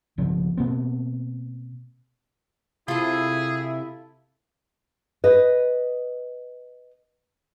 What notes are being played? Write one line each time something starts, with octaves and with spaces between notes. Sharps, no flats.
B1 C#3 F3
B2 A#3 C4
C3 E4 F4 G#4 A4
B4 D#5